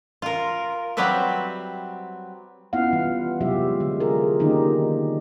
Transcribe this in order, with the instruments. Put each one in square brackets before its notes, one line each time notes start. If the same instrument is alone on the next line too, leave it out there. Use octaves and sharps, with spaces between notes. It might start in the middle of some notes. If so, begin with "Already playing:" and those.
[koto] F4 A#4
F#3 G3 C4 B4 E5
[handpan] B3 C#4 E4 F4 F5 F#5
E3 G3 F4
C3 F#3 G#3 F4 G4 E5
D3 G#3
D4 F4 G#4 A#4
D3 D#3 A#3 C#4 D#4 G4